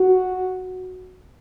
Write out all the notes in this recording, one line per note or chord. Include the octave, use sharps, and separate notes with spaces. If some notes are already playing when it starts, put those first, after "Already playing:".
Already playing: F#4